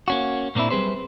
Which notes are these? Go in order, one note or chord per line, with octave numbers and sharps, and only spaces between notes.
A#3 C#4 F#4
A#2 A#3 C4 D4 E4
F#3 G3 C4 G#4 B4 C5